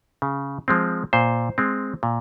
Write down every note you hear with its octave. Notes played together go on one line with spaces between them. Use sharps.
C#3
F3 G#3 C4
A#2 C5
G#3 C4
A#2